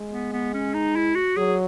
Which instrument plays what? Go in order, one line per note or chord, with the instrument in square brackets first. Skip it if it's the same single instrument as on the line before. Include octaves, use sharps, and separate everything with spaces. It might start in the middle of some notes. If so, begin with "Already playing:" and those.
Already playing: [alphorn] G#3
[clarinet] B3
B3
C#4
D#4
E4
F#4
[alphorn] F#3 [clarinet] G#4